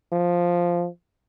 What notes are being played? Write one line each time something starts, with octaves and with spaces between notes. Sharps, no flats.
F3